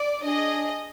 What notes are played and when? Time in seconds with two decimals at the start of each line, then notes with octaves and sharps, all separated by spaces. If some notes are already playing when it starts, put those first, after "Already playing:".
Already playing: D5
0.23 D4 G#4 D#5